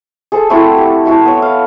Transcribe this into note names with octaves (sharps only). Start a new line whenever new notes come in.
G#4 A4 C5
A3 C4 E4 F#4
G4
E4 F#4 A5
B3 C#5
F5